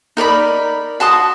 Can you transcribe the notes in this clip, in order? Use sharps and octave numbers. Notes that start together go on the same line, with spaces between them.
D#4 A#4 D5 B5
F#4 A5 C6 D#6